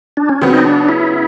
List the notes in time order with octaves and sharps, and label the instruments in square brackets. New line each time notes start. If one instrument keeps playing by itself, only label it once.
[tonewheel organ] D4
C#4
[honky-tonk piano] C#3 F#3 B3 [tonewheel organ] C4
[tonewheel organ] D#4
D4
E4